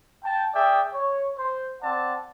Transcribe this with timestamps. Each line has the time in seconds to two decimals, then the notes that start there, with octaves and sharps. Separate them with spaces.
0.23 G5 A5
0.54 G#4 D5 E5 G5
0.94 C#5
1.38 C5
1.82 C4 D5 F#5 A5